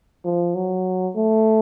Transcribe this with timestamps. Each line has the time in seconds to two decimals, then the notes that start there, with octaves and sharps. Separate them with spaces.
0.24 F3
0.55 F#3
1.16 A3